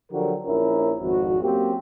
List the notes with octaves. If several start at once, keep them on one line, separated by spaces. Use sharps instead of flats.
D3 F3 F#3 F#4 G4 A#4
A#1 C#4 E4 A#4
G#1 F2 F#4
F#3 A#3 C4 C#4 G4